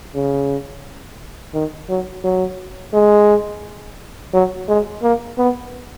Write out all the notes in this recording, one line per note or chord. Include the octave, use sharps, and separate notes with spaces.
C#3
D#3
F#3
F#3
G#3
F#3
G#3
A#3
B3